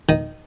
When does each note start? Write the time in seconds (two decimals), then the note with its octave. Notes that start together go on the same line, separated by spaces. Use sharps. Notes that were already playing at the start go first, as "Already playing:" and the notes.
0.09 D#3